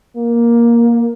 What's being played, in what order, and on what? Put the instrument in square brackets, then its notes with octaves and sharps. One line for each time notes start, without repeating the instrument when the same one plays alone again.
[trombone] A#3